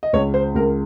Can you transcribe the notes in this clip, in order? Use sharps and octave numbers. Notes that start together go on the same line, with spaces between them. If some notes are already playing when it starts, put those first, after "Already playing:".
D#5
C#2 C#5
C5
C#2 A#4